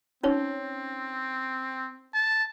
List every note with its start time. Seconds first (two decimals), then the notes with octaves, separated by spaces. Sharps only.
0.23 C4 C#4 D#4 C#5
2.14 A5